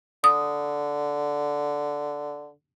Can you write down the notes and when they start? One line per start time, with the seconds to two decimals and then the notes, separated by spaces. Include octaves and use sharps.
0.24 D3 D#6